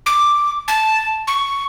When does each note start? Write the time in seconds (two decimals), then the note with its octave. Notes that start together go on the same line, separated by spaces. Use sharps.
0.06 D6
0.68 A5
1.27 C#6